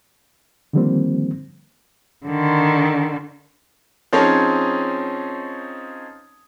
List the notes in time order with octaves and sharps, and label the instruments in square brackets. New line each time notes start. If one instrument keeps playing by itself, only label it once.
[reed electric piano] D3 D#3 F3 G3 A#3 C4
[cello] D3 D#3
[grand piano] F3 C4 C#4 D#4 G#4 C#5